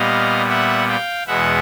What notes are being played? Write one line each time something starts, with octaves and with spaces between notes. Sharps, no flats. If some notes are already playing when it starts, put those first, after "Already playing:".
Already playing: A#2 G3 B3 D#5 F5
E5 F#5
F5 G5
E2 B2 G#3 B3 E5 F#5